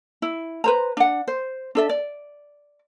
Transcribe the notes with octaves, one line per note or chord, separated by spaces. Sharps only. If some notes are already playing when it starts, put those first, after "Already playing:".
E4
B4 C5 A#5
D4 F#5
C5
D4 A4 E5
D5